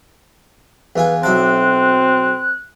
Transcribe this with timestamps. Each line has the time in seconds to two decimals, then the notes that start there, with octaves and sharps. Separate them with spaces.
0.96 E2 F4 B4 G#5
1.23 B1 C4 E4 A5 F#6